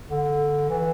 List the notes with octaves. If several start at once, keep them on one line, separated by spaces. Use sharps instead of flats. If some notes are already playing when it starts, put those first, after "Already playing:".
D3
E3